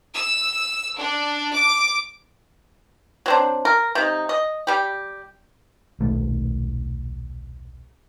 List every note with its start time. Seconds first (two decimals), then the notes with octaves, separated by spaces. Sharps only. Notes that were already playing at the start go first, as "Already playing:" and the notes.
0.14 E6
0.98 D4
1.54 D6
3.26 F#3 C4 D4
3.65 A#4
3.95 C3 D#4
4.29 D#5
4.67 G3 G4
6.00 D#1 B1 D#3 A3